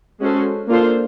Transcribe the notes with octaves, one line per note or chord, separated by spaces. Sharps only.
G#3 C#4 F#4 A4 C5
A#3 D4 F4 A4 C5